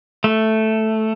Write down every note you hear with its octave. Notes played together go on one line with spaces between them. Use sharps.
A3